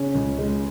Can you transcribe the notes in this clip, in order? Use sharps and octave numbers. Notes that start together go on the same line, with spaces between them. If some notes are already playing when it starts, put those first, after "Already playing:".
Already playing: C#3 C#4
C#2
G#3